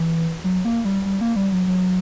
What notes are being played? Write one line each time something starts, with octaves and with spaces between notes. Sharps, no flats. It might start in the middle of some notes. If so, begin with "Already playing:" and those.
Already playing: E3
F#3
A#3
G3
G3
A#3
G3
F#3
F#3